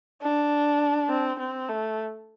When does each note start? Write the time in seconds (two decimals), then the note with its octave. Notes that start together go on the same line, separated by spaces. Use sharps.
0.22 D4
1.09 C4
1.40 C4
1.69 A3